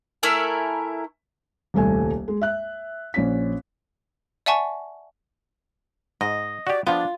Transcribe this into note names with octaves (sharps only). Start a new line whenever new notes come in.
A3 E4 A#4 G#5
D#1 C2 A3 G#5
G#3
E5 F#6
A#1 C#4 B6
D5 E5 F#5 G#5 A5 C#6
G#2 D#5
F#4 G4 D5
F3 B3 D4 F4